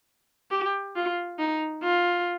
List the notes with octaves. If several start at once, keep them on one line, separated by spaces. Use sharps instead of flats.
G4
F4
D#4
F4